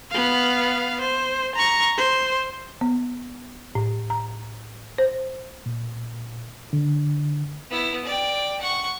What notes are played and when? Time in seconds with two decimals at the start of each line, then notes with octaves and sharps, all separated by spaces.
0.11 B3 F5
1.01 C5
1.55 A#5 C#6
1.97 C5
2.81 B3
3.75 A2
4.10 A#5
4.98 C5
5.66 A#2
6.73 D3
7.70 B3 E4
8.05 D5 G5
8.61 F#5 C#6